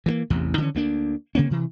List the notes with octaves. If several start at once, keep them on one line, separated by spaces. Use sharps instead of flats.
E3 F#3 A#3
A1 E2 C3
D3 E3 G#3 C#4
D2 A#3 D4
C#3 A#3 C4 C#4
C3 E3